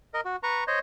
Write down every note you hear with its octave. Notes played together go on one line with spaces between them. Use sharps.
A#4 D#5
F#4
B4 A#5 C#6
C5 C#5 D#5